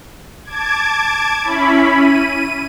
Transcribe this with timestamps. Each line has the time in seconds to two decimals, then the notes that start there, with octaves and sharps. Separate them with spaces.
0.44 A5 D6 G#6
1.42 C#4 E4 B5
1.94 D#7